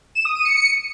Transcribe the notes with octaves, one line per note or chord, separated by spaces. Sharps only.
E7
D#6
D#7
C#7